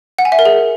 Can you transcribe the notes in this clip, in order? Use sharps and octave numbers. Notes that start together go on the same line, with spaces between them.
F#5
G#5
E5
A#4
G#4